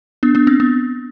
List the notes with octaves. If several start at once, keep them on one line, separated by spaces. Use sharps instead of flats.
B3 D4
B3 D4
C4
B3